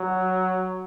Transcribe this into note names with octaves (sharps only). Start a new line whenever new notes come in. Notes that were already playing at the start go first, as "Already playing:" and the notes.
Already playing: F#3